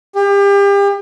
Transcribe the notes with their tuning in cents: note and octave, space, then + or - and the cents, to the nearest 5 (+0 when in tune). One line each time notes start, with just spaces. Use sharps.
G4 +35